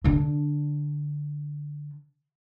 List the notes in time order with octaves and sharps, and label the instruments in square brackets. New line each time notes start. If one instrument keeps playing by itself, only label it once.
[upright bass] D3 D4